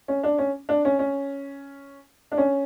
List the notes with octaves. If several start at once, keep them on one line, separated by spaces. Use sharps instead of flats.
C#4
D4
C#4
D4
C#4
C#4
D4
C#4